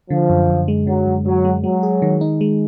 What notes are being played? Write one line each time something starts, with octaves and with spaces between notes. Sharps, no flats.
D3 F3
F#2
F#2
G#3
D3 F#3
F#2
F#2 F#3
G#3
F#3 G#3
G#4
D#3
D#4
G#3